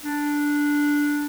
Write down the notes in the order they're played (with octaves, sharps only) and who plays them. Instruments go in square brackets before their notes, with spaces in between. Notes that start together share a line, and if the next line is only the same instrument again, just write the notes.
[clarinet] D4